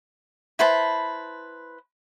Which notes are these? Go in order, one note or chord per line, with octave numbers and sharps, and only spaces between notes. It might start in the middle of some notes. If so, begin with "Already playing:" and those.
E4 B4 C5 A5